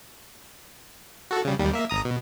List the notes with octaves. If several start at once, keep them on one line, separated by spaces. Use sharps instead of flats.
F#4 A4
C#3 G3
D#2 G3
A#3 E5
G#1 A#5 D#6
B2